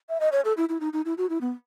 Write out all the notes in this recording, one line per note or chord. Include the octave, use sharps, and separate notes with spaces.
E5
D#5
C#5
A4
E4
E4
D#4
D#4
E4
F#4
E4
B3